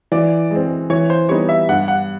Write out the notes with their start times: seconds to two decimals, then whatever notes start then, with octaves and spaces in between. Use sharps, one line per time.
0.12 E3 D5
0.51 G#3 C4
0.90 E3 C#5
1.10 C5
1.29 G3 B3 D#4 C#5
1.49 E5
1.69 G2 F#5
1.88 F#5